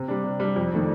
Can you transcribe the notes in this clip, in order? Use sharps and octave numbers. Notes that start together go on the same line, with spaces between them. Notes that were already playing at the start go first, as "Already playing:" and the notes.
Already playing: C3
G3 D4
C3
G3 D4
F2
D#3 A3 D4